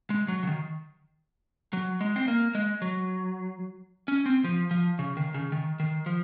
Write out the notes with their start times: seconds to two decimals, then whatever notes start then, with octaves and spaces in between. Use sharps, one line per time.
0.10 G#3
0.28 F#3
0.43 C#3
0.47 D#3
1.73 F#3
2.01 G#3
2.16 C4
2.28 A#3
2.55 G#3
2.82 F#3
4.08 C#4
4.26 C4
4.44 F3
4.71 F3
4.99 C#3
5.17 D#3
5.34 C#3
5.52 D#3
5.80 D#3
6.06 F3